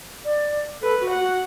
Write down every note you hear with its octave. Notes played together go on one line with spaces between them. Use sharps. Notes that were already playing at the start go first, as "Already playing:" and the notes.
D5
A4 B4
F#4
F#5
F#4